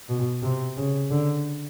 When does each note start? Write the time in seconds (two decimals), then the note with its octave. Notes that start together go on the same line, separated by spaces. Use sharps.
0.10 B2
0.43 C3
0.77 C#3
1.11 D3